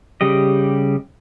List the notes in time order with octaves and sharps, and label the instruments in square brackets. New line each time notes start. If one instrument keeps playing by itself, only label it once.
[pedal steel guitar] C#3 G3 G4 D#5